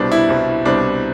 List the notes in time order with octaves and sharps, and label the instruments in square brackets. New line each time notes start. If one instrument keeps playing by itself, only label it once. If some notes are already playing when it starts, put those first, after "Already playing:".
Already playing: [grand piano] C2 B2 G3 C4 D4
E4
C2 B2 G3 C4
C2 B2 G3 C4 D4